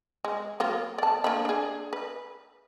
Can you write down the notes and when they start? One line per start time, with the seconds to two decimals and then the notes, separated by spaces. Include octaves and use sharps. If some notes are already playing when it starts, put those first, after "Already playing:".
0.25 G#3
0.60 F#3 A#3 F4
0.98 D5 A5
1.24 A#3 D4 B5
1.45 D4 G#4
1.93 B4